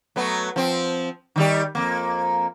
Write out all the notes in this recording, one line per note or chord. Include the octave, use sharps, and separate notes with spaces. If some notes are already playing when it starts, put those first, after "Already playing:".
F#3 A3 B3
F3 C4
D#3 G3 G4
F2 A#3